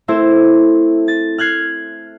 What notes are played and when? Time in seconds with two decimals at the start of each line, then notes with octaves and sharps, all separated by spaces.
0.08 A3 C4 E4 C5
1.08 A6
1.38 F6 F#6 G#6 C7